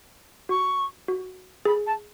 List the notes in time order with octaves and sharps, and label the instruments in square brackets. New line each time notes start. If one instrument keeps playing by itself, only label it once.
[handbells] F#4 [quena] C#6
[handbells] F#4
[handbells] G#4 [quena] B5
[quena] A5